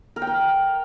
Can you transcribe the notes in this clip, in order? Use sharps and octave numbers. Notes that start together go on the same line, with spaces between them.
A#4
G5
A#4